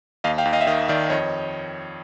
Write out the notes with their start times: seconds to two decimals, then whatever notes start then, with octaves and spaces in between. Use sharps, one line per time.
0.24 D#2 D#5 F5
0.38 F5 G5
0.45 D#2
0.53 D#5 F5
0.61 E5
0.67 D#3 D#5 F5
0.88 D#3 D5 E5
1.10 F2 C#5 D#5